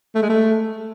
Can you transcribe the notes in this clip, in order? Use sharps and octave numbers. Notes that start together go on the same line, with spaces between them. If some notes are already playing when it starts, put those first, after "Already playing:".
A3
G#3
A3